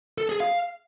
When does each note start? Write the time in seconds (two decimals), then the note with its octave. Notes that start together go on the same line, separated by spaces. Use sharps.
0.18 A4
0.29 G#4
0.40 F5